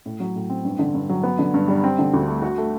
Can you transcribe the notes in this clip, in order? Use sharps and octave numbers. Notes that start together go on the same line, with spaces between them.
A2
F#3
A2
C4
G2
D3
G2
F#3
B3
D3
G2
G3
C4
D3
D2
A3
F#4
A3